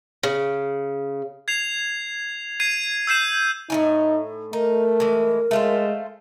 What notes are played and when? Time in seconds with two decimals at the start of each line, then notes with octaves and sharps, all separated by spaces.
0.23 C#3
1.48 G#6 C7 F7
2.60 G#6 C7 D#7
3.07 E6 G6 C7 E7
3.70 A2 C#4 D#4 G#5
4.53 A3 D#4 A#4
5.00 E3 G#3
5.51 G#3 A3 F4 C5